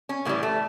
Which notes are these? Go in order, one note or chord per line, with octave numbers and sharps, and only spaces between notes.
C#4
A2 E3 G3 A#3
A3